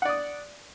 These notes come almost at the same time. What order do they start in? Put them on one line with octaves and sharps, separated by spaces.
F#5 D5 D#6